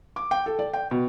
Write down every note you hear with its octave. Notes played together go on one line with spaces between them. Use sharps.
D6
G5
A4
D5
G5
B2